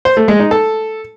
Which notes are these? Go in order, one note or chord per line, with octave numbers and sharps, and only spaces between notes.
C5
A3
G#3
D#4
A4